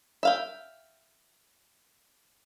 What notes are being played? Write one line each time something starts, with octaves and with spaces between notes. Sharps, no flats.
E5 F5 G5